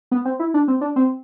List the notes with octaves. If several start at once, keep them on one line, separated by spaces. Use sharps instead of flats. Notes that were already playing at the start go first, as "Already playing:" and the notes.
B3
C4
E4
D4
C4
D4
C4